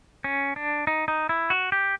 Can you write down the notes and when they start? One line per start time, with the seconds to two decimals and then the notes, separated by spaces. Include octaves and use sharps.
0.24 C#4
0.56 D4
0.87 D#4
1.08 D#4
1.29 E4
1.50 F#4
1.72 G4